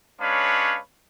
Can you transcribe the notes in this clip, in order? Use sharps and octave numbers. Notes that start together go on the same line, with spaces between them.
G#3 C#4 D4 B4 C#5 F5